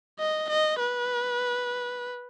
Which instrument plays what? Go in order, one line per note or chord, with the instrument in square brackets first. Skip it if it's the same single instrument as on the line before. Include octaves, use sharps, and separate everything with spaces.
[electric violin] D#5
D#5
B4